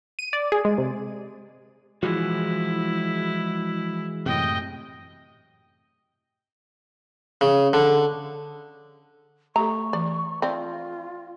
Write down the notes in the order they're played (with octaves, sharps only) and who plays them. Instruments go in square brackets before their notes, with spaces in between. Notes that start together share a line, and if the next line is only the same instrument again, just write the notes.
[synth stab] D#7
D5
G#4
G#3
C3
[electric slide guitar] E3 G#3 F#4 [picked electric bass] F3 [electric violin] E4
[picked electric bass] F#2 A2 C3 [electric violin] D#5 G5
[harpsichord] C#3
D3
[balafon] A3 G4 A4 [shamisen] A#5 [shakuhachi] C#6
[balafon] E3 [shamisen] D5
[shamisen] F3 C4 [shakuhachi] F4 [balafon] D5